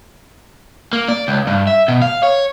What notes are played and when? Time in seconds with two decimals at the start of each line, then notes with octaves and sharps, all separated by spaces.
0.93 A#3
1.09 D5
1.28 C#2
1.47 G2
1.67 E5
1.88 B2
2.02 F5
2.23 C#5